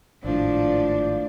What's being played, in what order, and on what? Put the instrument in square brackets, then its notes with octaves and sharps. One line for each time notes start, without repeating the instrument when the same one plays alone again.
[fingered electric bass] G#1 A2 [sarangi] F3 [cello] D4 [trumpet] D5